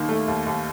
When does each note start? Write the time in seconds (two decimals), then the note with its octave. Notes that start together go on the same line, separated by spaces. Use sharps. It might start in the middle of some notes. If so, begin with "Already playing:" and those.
Already playing: D#2 D#3 A#3
0.09 A3
0.28 D#2
0.47 D#2